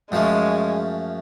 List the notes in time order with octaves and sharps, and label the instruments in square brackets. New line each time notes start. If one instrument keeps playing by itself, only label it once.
[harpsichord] F#2 F3 A3 C#4 [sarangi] G#3